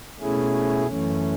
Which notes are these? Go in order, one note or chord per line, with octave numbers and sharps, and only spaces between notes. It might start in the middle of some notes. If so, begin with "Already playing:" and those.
B2 A3 C#4 E4 G#4
F#2 E3 A3 C#4